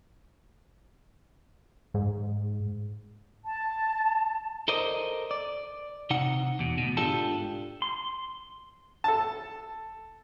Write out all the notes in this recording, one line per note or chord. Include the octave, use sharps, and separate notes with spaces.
G#2
A5
A4 A#4 C5 D5 D#5
D5
C3 D#4 F#5
E2 B2
D2 B2
G#2 D4 F4 G4 A4
C6
A4 A5